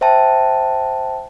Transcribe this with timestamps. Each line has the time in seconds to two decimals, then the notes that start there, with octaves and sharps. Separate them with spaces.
0.01 C5 E5 G5 A5